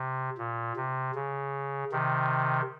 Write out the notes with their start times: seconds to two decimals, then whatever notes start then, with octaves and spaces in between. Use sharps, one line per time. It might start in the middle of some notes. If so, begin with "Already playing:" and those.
Already playing: C3
0.38 A#2
0.76 C3
1.15 C#3
1.92 C3 D#3